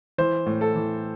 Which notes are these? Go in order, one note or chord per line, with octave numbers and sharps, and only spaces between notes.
E3 C5
A2
A4
E3